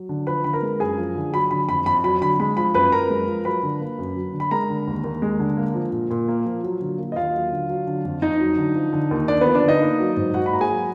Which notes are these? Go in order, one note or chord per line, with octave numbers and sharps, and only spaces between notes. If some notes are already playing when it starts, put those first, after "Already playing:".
Already playing: F#3
D3
F3 B4 B5
D3 B5
A#4 A#5
G#3
F#2 G#4 G#5
F3
D3
F#3 B5
D3 B5
F2 B5
F2 B5
F#3 B5
D3 B5
G#3 B5
F3 B5
F#2 B4 B5
F#2 A#4 A#5
G#3
F3
F#3 B4 B5
D3
A#3
F#2
F#3
D3
B5
G#3 A#4 A#5
D3
D#2
D#2
G#3
D3
A#3
F3
A#2
A#2
A#3
F3
F#3
D3
A#3
D#5
D#2 F4 F5
F#3
D3
F#3
D3
F2
F2 D#4 D#5
F#3
D3
F3
D3
D#2
D#2 D4 D5
F3 B3 B4
D4 D5
D3 D#4 D#5
A#3
F#3
G#2
G#2 F#4 F#5
B5
A#3 A#5
G#4 G#5
F#3